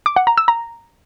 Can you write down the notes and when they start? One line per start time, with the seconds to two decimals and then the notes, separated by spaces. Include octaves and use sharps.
0.06 D6
0.16 F#5
0.27 A#5
0.37 E6
0.48 A#5